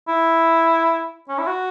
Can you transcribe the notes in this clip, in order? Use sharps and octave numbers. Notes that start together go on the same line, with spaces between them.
E4
C#4
E4
F#4